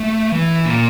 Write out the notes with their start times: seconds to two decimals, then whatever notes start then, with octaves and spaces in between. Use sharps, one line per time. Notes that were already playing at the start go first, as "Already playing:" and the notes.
Already playing: A3
0.32 E3
0.66 A#2